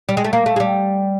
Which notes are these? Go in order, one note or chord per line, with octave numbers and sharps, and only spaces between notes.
G3
G#3
A3
A#3
A3
G#3
G3